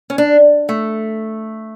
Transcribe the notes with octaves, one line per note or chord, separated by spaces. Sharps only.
C#4
D4
A3